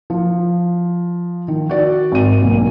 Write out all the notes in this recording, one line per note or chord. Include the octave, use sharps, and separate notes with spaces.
F3
D#3
F#4 D5
G#1 D#7
B1 B2 A#3